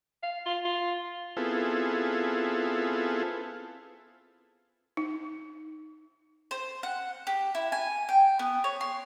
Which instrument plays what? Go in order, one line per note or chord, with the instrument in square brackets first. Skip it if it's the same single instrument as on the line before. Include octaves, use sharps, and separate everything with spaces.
[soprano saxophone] F5
F4
F4
[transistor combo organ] B3 C4 E4 F4 G#4 A4
[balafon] D#4
[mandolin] C5
F#5
G4
E4
G#5
G5
B3
C#5
C6